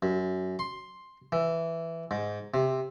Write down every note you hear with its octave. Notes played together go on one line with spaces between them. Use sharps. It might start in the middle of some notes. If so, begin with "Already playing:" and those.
F#2
C6
E3
G#2
C3